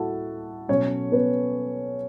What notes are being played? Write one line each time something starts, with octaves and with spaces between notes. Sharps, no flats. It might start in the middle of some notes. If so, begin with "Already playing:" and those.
Already playing: A2 E4 F#4 A4 F#5 A5
B2 F#3 C#4 C#5
B3 B4